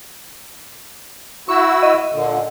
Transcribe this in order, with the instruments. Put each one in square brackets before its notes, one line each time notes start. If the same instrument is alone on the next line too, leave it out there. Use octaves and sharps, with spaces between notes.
[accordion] E4 F#4 E6 [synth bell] C#6
[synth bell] D#5
[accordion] A#2 D3